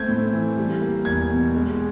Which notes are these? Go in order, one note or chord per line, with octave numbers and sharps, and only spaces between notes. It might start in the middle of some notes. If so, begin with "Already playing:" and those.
Already playing: A3 C4 G6 G#6
A2
E3
G3
A#3
E2 G#6
B2
G#3